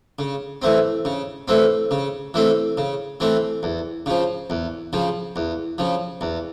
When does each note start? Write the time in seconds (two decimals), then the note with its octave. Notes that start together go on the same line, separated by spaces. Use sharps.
0.19 C#3
0.62 E3 A3 C4
1.05 C#3
1.48 E3 A3 C4
1.91 C#3
2.34 E3 A3 C4
2.78 C#3
3.20 E3 A3 C4
3.63 E2
4.06 C#3 F3
4.50 E2
4.93 C#3 F3
5.36 E2
5.78 C#3 F3
6.21 E2